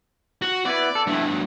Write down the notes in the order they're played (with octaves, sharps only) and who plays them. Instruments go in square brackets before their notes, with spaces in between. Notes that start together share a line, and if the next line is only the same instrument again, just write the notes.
[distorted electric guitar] F#4
[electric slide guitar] B3 E4 B4 [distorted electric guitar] D5
[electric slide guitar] A4
[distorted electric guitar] G2 B2 [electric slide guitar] E4
[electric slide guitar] F#3